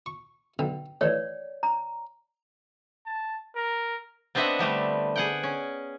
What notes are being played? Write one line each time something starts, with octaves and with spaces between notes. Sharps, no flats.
C#6
B1 D3 G5
E3 A3 C#5 D5
A#5
A5
A#4
B3 C4 D4 D#5 E5 F#5
D3 G3 A3
G#4 F#5 G5
C#4